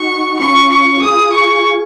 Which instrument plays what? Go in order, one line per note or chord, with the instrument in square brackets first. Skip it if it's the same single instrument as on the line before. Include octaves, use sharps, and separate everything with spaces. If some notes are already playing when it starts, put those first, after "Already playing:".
Already playing: [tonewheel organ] D#4 F#4 [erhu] C#6
[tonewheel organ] C#4 F4 [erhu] C#6
[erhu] C#6
[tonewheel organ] F4 G#4 [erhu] D#6
[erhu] C#6